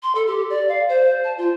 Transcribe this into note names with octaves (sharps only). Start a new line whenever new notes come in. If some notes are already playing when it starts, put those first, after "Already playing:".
C6
A4
G4
D5
F5
C5
A5
F4